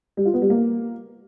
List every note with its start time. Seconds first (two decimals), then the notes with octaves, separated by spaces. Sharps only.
0.17 G3
0.25 F4
0.34 B3
0.42 G3
0.50 A#3